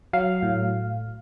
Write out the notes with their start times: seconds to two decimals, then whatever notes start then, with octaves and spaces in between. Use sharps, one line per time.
0.13 F#3 F5
0.43 A2